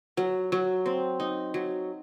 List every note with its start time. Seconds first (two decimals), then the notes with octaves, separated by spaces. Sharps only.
0.17 F#3
0.52 F#3
0.86 C4
1.20 D#4
1.54 F#3